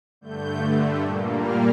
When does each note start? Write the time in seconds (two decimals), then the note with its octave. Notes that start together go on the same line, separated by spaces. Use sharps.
0.21 G2 D3 A3 G6
1.02 A#2 G3 A#3
1.42 F6